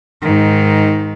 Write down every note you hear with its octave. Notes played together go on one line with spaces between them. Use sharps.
G#2 D#3